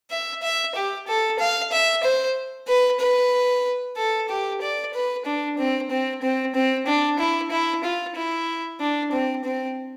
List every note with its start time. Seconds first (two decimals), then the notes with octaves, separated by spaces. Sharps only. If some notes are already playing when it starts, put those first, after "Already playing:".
0.11 E5
0.42 E5
0.75 G4
1.07 A4
1.40 F5
1.72 E5
2.04 C5
2.68 B4
3.00 B4
3.97 A4
4.29 G4
4.62 D5
4.94 B4
5.26 D4
5.58 C4
5.91 C4
6.22 C4
6.55 C4
6.87 D4
7.19 E4
7.51 E4
7.84 F4
8.16 E4
8.80 D4
9.12 C4
9.45 C4